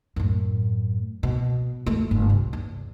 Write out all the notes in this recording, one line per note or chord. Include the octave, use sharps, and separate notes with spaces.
F#2 A2
B2
E2 A3
G1
C2
E2